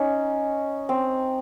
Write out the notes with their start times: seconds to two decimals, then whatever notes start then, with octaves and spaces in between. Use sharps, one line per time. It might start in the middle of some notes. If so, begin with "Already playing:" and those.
Already playing: C#4 D#4
0.89 C4